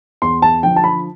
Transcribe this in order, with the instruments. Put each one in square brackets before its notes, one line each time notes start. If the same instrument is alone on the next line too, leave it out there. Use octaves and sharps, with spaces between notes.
[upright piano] E2 C6
A5
D3 F3 G5
A5
B5